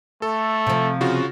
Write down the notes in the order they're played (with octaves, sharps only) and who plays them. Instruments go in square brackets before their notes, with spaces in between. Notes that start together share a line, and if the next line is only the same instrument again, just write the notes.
[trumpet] A3 [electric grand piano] A4
[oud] C3 F3
[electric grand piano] C#3 F4 F#4